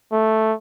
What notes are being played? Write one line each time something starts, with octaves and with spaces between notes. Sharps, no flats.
A3